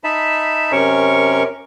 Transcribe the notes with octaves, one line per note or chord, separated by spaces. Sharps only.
D#4 E5 A5 B5
F#2 C3 C#4 A#4 C#5 C#6